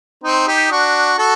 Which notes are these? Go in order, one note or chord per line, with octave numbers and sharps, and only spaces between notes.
C4 D#4
D#4 G4
D4 F#4
F#4 A4